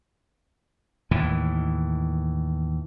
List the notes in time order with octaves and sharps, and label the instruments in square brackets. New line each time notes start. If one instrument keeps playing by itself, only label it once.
[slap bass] D#2 A2 E3